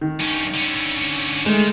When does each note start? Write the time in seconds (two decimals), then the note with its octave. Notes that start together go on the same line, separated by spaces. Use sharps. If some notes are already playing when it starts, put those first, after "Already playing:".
0.01 D#3
0.20 G2 C#4
0.54 D3 C#4
1.46 D#3 G#3 A3